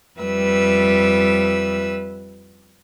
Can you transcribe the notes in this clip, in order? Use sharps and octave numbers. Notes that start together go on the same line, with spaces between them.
F2 G3 B4 E5 E6